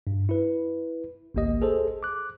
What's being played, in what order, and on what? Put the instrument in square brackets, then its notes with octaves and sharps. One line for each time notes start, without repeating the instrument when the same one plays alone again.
[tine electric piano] G2
E4 B4
G#1 C#2 A#3 G4 D#5
G#4 A4 C5
D6 F#6